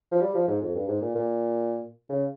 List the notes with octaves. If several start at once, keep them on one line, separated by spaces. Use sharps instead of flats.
F3
G3
F3
G#2
F2
G2
G#2
A#2
A#2
C#3